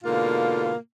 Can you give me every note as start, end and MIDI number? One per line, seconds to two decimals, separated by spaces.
0.04 0.73 44
0.04 0.73 47
0.04 0.73 50
0.04 0.73 58
0.04 0.73 65